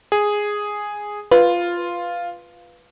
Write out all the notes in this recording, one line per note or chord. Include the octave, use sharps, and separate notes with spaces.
G#4
F4 B4